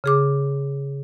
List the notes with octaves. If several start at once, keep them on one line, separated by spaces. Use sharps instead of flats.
C#3 G#4 D6